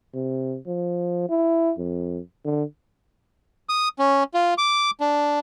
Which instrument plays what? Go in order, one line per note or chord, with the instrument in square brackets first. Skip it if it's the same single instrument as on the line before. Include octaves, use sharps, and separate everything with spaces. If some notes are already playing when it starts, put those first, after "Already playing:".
[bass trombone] C3
F3
E4
F2
D3
[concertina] D#6
C#4
F4
D6
D4